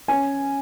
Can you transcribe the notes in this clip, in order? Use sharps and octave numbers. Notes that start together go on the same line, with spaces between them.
C#4 G#5